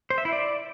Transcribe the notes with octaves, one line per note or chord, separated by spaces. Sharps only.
C5
E5
E4
D5